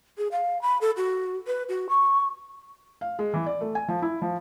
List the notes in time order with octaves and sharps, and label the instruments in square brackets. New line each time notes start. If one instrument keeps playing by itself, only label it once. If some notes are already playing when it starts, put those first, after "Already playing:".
[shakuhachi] G#4
F5
B5
A4
F#4
B4
F#4
C#6
[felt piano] F5
G#3
E3
D5
A3
G#5
F3
E4
F3